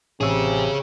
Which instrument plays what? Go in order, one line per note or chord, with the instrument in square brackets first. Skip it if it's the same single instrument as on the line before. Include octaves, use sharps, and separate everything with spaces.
[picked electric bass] A1 [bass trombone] C3 [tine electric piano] C#4 E6 [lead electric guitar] G#4 C#5